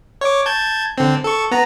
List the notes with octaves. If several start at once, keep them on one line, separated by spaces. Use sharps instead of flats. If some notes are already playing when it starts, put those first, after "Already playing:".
C#5 D6
A5 G6 G#6
D3 C4
A4 C#6
B3 A#5